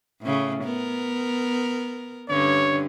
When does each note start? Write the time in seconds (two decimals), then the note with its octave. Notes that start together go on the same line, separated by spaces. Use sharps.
0.22 A2 C#3
0.64 B3 A#4
2.30 G2 D3 C#4 C#5